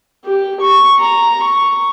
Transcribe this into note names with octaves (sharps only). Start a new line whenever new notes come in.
G4
C#6
A#5
C#6